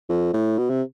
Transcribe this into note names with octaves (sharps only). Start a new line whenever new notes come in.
F2
A2
B2
C3